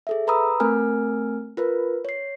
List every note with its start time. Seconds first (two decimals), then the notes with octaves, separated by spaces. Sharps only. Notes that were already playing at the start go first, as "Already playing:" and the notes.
0.07 G#4 A4 E5
0.27 B4 A#5 B5 D#6 E6
0.60 A3 C4 A#4 G#5 F6
1.57 F4 A#4 B4
2.05 C#5 C7